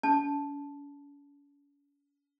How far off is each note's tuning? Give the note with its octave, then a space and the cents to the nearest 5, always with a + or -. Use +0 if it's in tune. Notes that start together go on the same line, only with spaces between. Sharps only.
C#4 +45 A5 -5